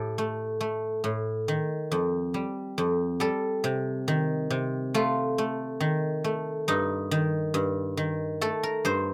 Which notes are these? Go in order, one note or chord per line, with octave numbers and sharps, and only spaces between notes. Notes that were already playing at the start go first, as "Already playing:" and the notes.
Already playing: A2 G4 A4
A3
A3
A2
D#3
F2
G3
F2
G3 A4
C3
D#3
C3
A3 F4
A3
D#3
A3
G2 D#4
D#3
G2
D#3
A3 A4
A#4
G2 C5